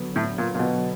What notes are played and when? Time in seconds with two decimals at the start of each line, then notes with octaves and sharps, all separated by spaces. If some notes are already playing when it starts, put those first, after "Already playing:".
Already playing: D3 F#3 B3
0.16 A2
0.38 A#2
0.55 A#2
0.59 B2